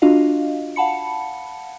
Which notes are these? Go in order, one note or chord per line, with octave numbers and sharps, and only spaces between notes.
D4 F4 F#4 D#5 F5
F5 F#5 A5 B5 C#7